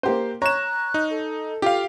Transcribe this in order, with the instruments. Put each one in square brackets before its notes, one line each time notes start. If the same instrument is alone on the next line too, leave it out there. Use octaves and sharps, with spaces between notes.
[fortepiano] A#3 G4 C5
[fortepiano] C#5 [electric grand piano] A#5 E7 [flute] F#6
[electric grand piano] D#4
[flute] A4
[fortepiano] F4 [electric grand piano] G4 F5